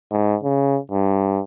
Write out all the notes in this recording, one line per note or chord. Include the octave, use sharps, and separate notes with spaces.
G#2
C#3
G2